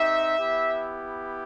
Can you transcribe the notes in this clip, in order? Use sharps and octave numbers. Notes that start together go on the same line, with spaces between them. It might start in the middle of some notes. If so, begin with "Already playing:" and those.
Already playing: C4 D#4 G4 E5
B3 E4 G4